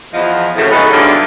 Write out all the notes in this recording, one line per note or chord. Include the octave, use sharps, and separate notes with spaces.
E2 F3 D#5
F#2 A2 C#3
D#2 B2 G#3 D#4 A4 B4
G#2 D3 E3 F#3 G3 F4